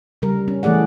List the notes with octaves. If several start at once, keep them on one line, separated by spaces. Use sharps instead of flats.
C#3 G3 A#4
C#4
E3 A3 G#4 D5 F#5